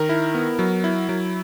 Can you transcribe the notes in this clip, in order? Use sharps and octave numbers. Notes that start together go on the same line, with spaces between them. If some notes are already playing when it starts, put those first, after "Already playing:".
Already playing: D#3 A#4
E4
B3
F#3
E4
F#3